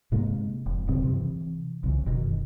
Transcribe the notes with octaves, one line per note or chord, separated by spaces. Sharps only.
G#2 C3 G#3 A#3
F1
D#1 G2 C#3 C4
C3 E3
C2 C#3 E3
F1 F#2 B2 D#3